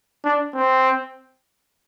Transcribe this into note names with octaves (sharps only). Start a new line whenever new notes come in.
D4
C4